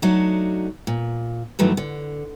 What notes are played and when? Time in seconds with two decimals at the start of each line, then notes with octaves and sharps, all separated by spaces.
0.02 F#3 A3 D4 D#4 F#4
0.87 A#2
1.59 G2 D#3 E3 F#3 A3
1.77 D3